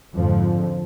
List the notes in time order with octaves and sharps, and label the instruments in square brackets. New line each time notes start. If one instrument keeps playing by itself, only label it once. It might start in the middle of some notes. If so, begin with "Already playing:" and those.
[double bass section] F2 G#2 D3 F3